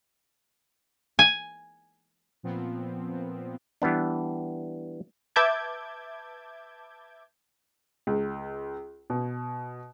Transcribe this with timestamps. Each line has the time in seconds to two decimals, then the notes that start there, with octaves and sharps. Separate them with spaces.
1.19 G#5
2.43 A#2 F3 B3 C4
3.82 E3 G3 B3 D4
5.36 B4 E5 A5 D6 G6 G#6
8.07 C#2
9.10 B2